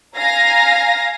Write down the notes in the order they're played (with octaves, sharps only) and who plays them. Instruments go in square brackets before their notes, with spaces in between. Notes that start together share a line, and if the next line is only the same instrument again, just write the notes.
[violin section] F5 G#5 A#5 A#6